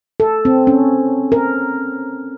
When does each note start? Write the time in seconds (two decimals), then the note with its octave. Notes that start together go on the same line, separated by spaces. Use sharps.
0.20 A4
0.45 C4
0.67 C#4
1.32 A#4